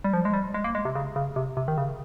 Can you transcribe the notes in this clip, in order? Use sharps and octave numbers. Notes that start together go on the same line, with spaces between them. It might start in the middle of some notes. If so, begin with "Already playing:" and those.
G3
F3
G#3
G3
G#3
A#3
G#3
C3
C#3
C#3
C3
C3
D#3
C#3